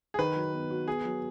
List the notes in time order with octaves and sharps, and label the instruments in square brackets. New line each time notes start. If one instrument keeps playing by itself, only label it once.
[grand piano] G#4
[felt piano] D#3 [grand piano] B4
[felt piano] F#3
B3
F#4
[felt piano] B3 [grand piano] G#4
[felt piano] F#3